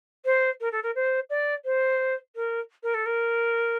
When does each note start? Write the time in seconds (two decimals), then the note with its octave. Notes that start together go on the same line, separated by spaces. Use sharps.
0.25 C5
0.60 A#4
0.72 A4
0.83 A#4
0.95 C5
1.30 D5
1.65 C5
2.35 A#4
2.83 A#4
2.94 A4
3.06 A#4